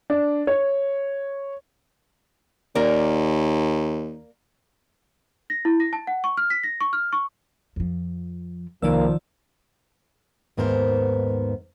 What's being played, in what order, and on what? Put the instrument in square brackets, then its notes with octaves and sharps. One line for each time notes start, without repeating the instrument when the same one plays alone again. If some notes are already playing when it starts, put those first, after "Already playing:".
[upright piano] D4
C#5
[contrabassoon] D#2 [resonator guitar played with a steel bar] A#3 A#4 D5
[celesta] A#6
E4
A#6
A5
F#5
C#6
F6
B6
A#6
C#6
F6
C#6
[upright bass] F2 F3
[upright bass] C2 [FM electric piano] D#3 D5 E6 [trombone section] F3 [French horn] A#3
[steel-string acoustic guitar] D#2 G#2 B3 A#4 C5